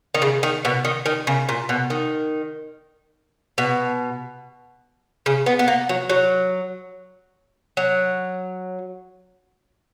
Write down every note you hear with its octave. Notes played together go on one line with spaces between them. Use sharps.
D#3
C#3
D#3
B2
D#3
D#3
C#3
A#2
B2
D#3
B2
C#3
B3
B3
A#3
F#3
F#3
F#3